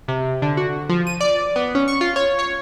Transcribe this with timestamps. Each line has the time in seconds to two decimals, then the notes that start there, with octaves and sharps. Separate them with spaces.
0.08 C3
0.42 D3
0.57 F#4
0.89 F3
1.07 D#7
1.21 D5
1.56 B3
1.75 C#4
1.88 C#6
2.01 F4
2.16 C#5
2.39 C#5